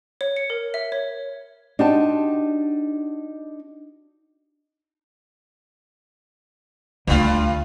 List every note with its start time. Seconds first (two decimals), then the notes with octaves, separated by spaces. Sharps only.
0.21 C#5
0.36 C#7
0.50 A#4
0.74 E5
0.92 C#5
1.79 D4 D#4 F#4 G4 C5 A5
7.07 D2 G2 D3 F4